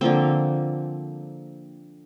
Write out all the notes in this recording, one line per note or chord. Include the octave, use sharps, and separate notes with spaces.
D3 F3 A#3 C4